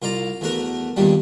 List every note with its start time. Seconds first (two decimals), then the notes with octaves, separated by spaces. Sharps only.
0.02 C2 F4 D5 A#5
0.41 E2 A3 F#4 A#4
0.97 E2 G2 A#2 D#3 G3